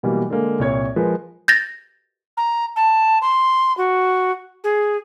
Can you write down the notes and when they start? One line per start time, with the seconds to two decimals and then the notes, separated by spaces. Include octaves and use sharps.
0.03 B2 E3 F#3 G3 A#3
0.30 D3 G#3 A#3
0.59 C2 A#2 C#5 G#6
0.96 F3 G#3 A#4 B4
1.48 G6 A6 A#6
2.37 A#5
2.76 A5
3.21 C6
3.77 F#4
4.64 G#4